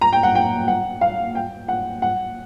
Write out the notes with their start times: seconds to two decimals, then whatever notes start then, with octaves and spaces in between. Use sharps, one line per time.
0.01 A#5
0.13 G5
0.23 F#5
0.35 G5
0.68 F#5
1.01 F5
1.35 G5
1.68 F#5
2.02 F#5